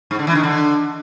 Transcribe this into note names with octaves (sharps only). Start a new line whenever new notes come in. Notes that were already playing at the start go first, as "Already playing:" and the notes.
G#2
D3
E3
D#3
D3